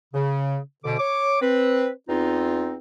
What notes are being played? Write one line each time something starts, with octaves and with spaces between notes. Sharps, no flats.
C#3
D2 B2 D3 D6
C#5 D6
C4 B4
E2 C4 D#4 F4